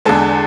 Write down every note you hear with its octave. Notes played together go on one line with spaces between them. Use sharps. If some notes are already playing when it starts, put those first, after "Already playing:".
E2 D3 G#3 A4